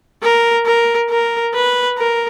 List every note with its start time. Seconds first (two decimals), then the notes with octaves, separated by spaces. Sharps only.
0.23 A#4
0.66 A#4
1.10 A#4
1.54 B4
1.98 A#4